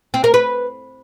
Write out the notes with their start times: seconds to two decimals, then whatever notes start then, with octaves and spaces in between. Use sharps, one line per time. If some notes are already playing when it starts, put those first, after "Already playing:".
0.14 C4
0.24 A#4
0.34 B4